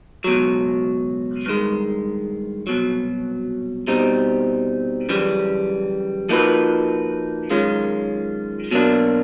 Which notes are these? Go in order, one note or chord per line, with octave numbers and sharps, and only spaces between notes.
C#2 B2 F#3
G2 D#3 G#3
C2 B2 F#3
B2 G3 C4 D#4
F#2 C#3 E3 G3
F3 A#3 D#4 F#4 B4
F#2 D#3 G#3 C#4 F4
B2 F#3 A#3 D4